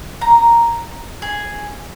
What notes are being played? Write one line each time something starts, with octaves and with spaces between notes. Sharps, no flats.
A#5
G#4